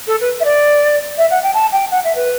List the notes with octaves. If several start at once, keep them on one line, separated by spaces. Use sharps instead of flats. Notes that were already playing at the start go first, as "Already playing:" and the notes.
A4
B4
E5
D5
E5
F#5
G5
A5
G5
F#5
E5
B4